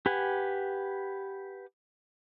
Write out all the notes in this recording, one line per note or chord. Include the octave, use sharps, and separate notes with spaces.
G4 B4 F#5 G#5